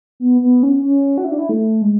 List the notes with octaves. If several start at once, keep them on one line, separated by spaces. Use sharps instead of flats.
B3
B3
C#4
C#4
F#4
E4
D4
E4
A3
G#3